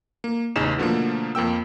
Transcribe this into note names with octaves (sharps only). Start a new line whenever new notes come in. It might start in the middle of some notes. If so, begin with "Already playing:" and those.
A#3
A1 E2 C#3 D#4 E7
B2 D3 F3 A3 A#3
F2 A#3 G5 E6